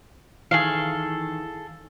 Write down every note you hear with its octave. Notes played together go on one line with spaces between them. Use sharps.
D#3 E3 G#4 A4 F5